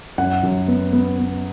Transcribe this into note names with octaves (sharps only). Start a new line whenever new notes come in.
F#2 F#5
F#2
B3
B3
B3